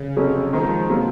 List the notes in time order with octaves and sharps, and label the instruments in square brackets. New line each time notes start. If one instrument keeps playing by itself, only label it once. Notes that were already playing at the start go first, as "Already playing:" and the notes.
Already playing: [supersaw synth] C#3
[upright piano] F2 C3 F#3 C#4 G#4
[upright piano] D#3 G#3 C4 D#4 [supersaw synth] F3
[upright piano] C3 F#3 A#3